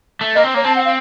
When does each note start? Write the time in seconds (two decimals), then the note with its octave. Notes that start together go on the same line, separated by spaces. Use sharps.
0.21 A3
0.36 A#3 D#5
0.44 C4
0.54 A#3 C#5
0.64 C4 A5
0.75 F#5
0.85 F5